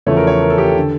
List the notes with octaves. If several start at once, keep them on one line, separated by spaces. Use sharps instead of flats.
E2 C#3 F3 A3 C#5
A#4
C#5
A#4
A4
G4
A4
D3